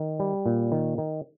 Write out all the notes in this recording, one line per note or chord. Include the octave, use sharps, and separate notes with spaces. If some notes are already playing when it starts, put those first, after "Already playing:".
Already playing: D#3
G3
A#2
D#3
D#3